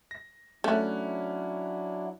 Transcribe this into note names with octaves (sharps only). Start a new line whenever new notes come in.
A#6
F#3 A3 C#4 D4 E4 C#6 F#6